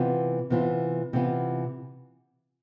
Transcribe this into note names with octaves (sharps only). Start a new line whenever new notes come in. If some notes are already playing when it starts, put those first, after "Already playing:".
Already playing: C3 E3 B3 F4
C3 E3 B3 F4
C3 E3 B3 F4